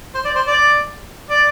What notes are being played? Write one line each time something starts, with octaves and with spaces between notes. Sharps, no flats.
C5
D5
C5
D5
D5